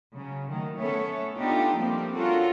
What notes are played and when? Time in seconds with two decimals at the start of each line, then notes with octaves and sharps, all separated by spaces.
0.16 C#3 F#3
0.47 D#3 F#3 A3
0.79 A3 B3 C#4 A4 C#5 E5
1.37 B3 D4 D#4 F4 G4 A4
1.75 F3 G3 A3 A#3 C4 G4
2.16 C#4 D4 F4 F#4 A4 A#4